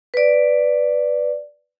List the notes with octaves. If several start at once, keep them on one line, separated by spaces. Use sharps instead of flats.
B4 D5